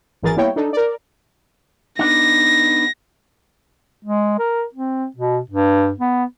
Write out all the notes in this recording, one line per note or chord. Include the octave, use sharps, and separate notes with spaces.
G#1 F#2 E3 G#4 A#4 A6
G3 A#3 B3 E4 C#5 G5
D4 D#4 A4
A#4 D5
B3 D4 D#4 A#6
G#3
A#4
C4
B2
G2
B3